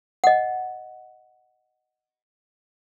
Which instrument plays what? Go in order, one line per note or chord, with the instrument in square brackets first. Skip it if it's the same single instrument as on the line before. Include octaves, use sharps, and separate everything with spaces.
[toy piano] D#5 F#5